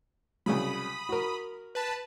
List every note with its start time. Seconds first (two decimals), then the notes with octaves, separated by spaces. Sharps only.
0.46 C2 C#3 F#3 B5 D#6
1.09 F#4 A#4
1.75 B4 A5